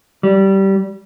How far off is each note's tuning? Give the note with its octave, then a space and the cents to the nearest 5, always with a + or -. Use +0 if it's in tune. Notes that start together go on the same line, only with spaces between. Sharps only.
G3 -15